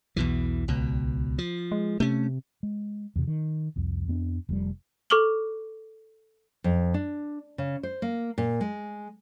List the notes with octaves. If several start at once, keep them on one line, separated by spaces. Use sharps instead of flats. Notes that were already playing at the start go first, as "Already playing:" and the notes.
B1 E2 B2 E3
C#2 B2
F3
G#3
C3 A3 C#4
G#3
E2 C3
D#3
C2 F2
F2 B3 C4 D4
F1 F2 A#2 G3
A4 C#6 D6 F6 F#7 G7
F2
D4
C#3
C5
A#3
A#2
G#3